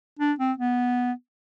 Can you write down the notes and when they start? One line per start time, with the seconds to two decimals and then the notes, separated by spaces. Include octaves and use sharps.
0.19 D4
0.39 C4
0.58 B3